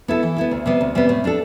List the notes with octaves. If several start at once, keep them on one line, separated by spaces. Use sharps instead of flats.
B3 E4 A4
E3
B3 E4 A4
D2
C3 G3 B3
D2
C3 G3 B3
A2
G3 D4 A4